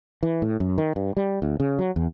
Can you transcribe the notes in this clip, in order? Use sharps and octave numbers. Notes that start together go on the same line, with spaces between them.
E3
A2
F#2
D#3
G2
G3
D2
C#3
F#3
E2